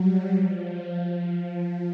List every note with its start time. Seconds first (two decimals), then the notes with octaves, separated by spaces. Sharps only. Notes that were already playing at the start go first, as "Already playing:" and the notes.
Already playing: F#3 G3
0.34 F3